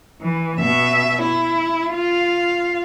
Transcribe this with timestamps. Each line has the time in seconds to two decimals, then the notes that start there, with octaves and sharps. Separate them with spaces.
0.21 E3
0.60 B2 E5
1.21 E4
1.93 F4 F5